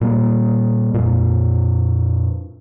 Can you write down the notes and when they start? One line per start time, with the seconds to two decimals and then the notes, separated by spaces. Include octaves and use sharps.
0.01 A#2 G3 A#3
0.94 F2 A#2